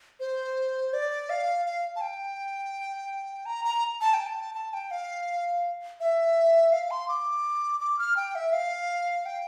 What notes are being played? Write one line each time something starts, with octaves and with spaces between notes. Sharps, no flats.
C5
D5
F5
F5
A5
G5
A#5
A#5
A5
G5
A5
A5
G5
F5
E5
F5
C6
D6
D6
F6
G5
E5
F5
G5